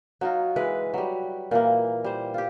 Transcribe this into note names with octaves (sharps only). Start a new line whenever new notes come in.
F#3 D#4 F4
E3 G#3 B4
F#3 G3
A#2 E3 A#3
G3 C5
F4 G4